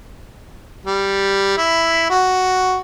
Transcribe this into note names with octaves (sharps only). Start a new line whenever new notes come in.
G3
E4
F#4